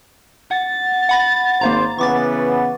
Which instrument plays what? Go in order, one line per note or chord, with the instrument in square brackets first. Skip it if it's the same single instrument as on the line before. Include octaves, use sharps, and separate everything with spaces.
[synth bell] F#5 [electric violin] A6
[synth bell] F#5 B5 A#6
[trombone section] G#1 C5 [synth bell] A#3 F5 A#5
[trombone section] C#3 E3 B3 [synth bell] C#6 D6 A6